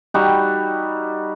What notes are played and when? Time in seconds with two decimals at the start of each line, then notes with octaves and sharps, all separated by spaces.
0.14 G3 D#4 F#4